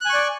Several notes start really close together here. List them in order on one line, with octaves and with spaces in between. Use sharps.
F#6 G#5 C#6 D5